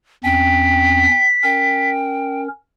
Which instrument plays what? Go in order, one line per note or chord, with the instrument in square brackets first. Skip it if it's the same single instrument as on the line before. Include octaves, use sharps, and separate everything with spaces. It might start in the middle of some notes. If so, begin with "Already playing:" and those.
[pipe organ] E2 C4 C#4 [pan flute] G5 [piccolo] B6
[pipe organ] C#4 A#4 [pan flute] G5